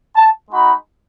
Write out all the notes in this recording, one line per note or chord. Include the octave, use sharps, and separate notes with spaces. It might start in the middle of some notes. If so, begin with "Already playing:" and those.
A5
G#3 D#4 F#4 B5